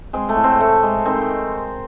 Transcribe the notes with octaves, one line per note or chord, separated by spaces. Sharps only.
G#3 C4
A3
A2
C4
A2 A3
G#3
D#3 C4